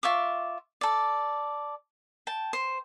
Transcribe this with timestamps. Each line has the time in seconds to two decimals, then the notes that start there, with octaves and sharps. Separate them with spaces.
0.03 F4 E5 C#6 D6
0.81 A4 D5
2.27 G5 A5
2.53 C5